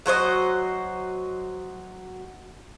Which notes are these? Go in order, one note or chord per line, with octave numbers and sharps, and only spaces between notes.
F#3 F#4 C5 D#5